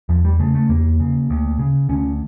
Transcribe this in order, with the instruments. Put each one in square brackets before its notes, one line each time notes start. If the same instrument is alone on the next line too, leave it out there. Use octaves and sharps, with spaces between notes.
[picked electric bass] E2 F3
G3
C#3 A3
A3
E2 A#3
C#3
D2
C#3
D2 C#4